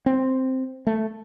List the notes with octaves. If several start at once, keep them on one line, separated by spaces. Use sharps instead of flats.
C4
A3